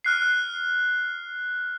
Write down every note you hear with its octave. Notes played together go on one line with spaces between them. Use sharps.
F6 F#6 C7